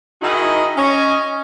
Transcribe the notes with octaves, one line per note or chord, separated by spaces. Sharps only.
D#3 D#4 E4 F#4 G#4 D#5
C#4 D#5